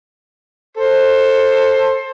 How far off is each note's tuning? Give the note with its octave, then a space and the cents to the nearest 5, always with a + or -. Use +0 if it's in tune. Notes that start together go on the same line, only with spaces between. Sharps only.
A4 +15 C5 +20